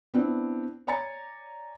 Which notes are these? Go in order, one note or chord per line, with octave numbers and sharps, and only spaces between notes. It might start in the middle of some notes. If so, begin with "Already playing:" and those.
B3 C4 D4 E4
C#5 D5 G#5 A#5 A6 C#7